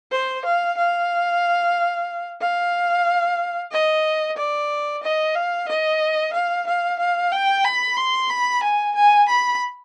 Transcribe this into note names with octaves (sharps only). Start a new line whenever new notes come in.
C5
F5
F5
F5
D#5
D5
D#5
F5
D#5
F5
F5
F5
G5
B5
C6
B5
G#5
G#5
B5